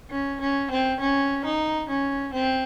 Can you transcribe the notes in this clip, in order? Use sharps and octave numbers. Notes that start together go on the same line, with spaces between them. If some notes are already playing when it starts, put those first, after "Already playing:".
C#4
C#4
C4
C#4
D#4
C#4
C4